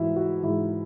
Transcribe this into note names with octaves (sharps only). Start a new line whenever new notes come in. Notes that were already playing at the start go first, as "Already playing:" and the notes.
Already playing: G#2 E3 E4 F#4
F#4
G#2 E3 E4